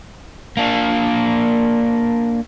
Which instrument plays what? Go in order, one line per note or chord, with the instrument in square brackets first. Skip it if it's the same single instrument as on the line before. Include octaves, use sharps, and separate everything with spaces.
[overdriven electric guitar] A#3 D4